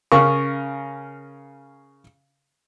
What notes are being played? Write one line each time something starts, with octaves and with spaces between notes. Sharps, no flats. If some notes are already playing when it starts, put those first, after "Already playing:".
C#3 C#4 A#4 C#6